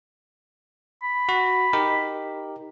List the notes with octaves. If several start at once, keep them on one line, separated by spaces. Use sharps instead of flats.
B5
F#4
D#4 G4 A#4